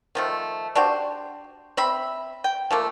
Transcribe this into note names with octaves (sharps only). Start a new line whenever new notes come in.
D#3 F3 A3
D4 F#4 G4 C5
C4 E5 B5
G5
F3 A3 A#3